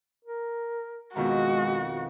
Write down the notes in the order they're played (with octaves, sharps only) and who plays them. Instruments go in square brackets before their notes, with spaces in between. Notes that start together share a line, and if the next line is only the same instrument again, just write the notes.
[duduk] A#4
[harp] F2 B2 D#3 [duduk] G#3 [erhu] F#4